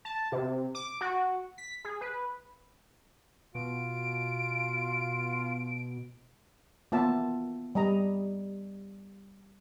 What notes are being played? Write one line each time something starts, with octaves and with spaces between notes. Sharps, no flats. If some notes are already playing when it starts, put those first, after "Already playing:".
A5
C3
D6
F#4
B6
G#4
B4
B2 F4 D7
A#3 B3 F4 E5 A5
G3 D#5 A#5